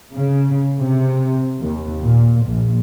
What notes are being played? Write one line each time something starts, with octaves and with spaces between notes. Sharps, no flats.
C#3
C3
D#2
A#2
A#1